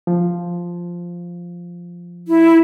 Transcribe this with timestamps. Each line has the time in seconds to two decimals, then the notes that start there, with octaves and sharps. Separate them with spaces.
0.07 F3
2.28 E4